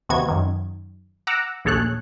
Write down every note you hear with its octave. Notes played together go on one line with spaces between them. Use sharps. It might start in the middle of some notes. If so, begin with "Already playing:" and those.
D#2 C3 D#3 B3 F#4 G#6
F#2 D#3
F#5 A#5 D6 E6
A#1 D#2 G#4 A4 C#5 F#6